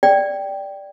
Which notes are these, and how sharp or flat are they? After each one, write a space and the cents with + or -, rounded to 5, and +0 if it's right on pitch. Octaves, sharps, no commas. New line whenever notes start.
D5 +0 G5 -5